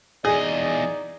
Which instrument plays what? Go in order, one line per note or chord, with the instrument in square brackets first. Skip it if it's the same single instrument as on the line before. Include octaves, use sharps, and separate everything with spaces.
[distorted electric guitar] E2 D#5 [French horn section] D#4 D5 [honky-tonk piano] G#4